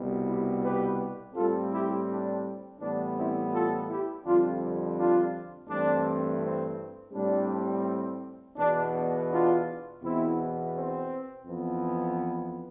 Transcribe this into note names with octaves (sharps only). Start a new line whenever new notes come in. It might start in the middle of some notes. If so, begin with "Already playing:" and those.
Already playing: C2 B2 G3 B3
E4 G4
G4 B4
A2 G3 C4 F4 A4
E4 G4
D4
A2 E3 G3 B3 D4
C4 E4
F4 A4
E4 G4
F2 D3 G3 C4 D4 F4
D4 F4
G2 E3 A3 C4 D4
C4
A2 G3 C4 D4
E2 B2 B3 D4
D4
D4 F4
E2 B2 B3 C4 E4
C4
F2 E3 B3